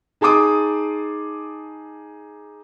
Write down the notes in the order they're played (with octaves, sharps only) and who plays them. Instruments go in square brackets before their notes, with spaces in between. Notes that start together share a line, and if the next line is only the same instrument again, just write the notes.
[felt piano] D#4 G#4 A5 C6 D6 D#6